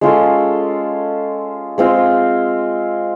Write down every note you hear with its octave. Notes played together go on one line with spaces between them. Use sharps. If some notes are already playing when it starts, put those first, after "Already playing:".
G#3 C#4 F4 A4
G#3 C4 F4